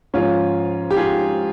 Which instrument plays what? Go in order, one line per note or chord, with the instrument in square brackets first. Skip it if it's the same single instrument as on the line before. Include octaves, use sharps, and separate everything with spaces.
[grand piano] G#2 F3 C#4 F4
G4
F4 G#4